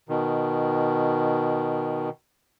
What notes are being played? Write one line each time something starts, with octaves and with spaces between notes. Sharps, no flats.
B2 D#3